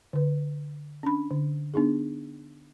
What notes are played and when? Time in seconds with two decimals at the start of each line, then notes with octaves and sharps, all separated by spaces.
0.13 D3 B4
1.03 C#4 D4 B5
1.31 D3
1.74 B3 D4 D#4 G#4